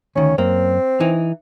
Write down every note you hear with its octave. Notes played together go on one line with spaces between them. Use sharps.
D2 D#3 C#4
F#2 A#3 C4
E3 D#4